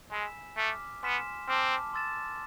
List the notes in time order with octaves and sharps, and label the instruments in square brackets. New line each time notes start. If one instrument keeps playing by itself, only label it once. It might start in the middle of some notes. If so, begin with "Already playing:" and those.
[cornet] G#3 [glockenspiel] G#5 B5 E6 B6 E7
[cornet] A3 [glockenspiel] D6 F6 B6
[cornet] B3 [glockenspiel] G#5 C6 F6 B6 E7
[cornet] C4 [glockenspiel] A5 D6 F6
[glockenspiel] C6 E6 A6 E7